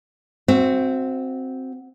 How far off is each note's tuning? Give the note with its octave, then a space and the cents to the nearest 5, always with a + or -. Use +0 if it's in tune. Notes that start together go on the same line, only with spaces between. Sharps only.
C4 +0 F#4 -5 E5 +35